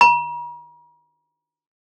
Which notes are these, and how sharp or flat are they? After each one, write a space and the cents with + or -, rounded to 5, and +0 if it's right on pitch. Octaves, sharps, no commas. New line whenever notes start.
A#5 +45